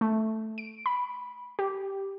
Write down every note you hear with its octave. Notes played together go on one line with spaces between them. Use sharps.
A3
D7
B5
G4